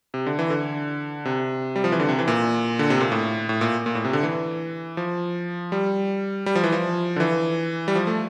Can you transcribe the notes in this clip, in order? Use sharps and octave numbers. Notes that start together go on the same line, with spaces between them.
C3
D3
E3
D3
C3
G3
F3
E3
D3
C3
E3
A#2
D3
C3
A#2
A2
A2
A#2
A#2
A2
C3
D3
E3
F3
G3
G3
F3
E3
F3
D3
E3
G3
F3
A3